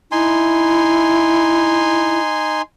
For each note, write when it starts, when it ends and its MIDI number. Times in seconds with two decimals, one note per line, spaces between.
0.12 2.62 63
0.12 2.20 64
0.12 2.62 80
0.12 2.62 84